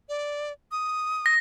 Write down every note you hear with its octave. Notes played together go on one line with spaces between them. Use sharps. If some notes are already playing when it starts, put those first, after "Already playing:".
D5
D#6
A#6